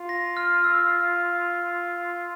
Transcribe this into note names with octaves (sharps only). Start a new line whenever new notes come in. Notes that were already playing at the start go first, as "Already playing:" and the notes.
Already playing: F4
A#6
F6
E6